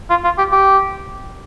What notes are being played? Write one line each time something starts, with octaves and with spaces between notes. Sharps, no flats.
F4
F4
G4
G4